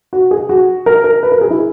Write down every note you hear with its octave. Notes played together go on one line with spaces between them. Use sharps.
F#4
G#4
F#4
A#4
A#4
B4
A#4
G#4
E4